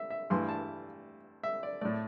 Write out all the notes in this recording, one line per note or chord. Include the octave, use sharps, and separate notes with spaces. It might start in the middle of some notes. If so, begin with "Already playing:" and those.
Already playing: E5
E5
G2 E3 A3 C6
A5
E5
D5
A2 A3 D5